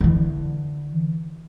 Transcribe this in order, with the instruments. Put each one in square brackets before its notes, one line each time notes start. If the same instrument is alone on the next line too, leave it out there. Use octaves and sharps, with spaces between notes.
[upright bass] D3 E3